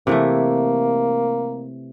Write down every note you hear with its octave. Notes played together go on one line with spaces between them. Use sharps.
C3 E3 A3 A#3